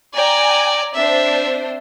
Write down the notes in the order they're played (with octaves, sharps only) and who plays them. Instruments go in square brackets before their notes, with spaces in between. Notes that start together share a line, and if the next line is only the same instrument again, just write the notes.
[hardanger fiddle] D5 [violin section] G5 G#5 A#5
[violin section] C4 D4 C5 [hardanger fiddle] E5